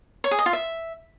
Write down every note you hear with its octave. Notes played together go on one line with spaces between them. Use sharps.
C#5
G#4
D#5
F4
E5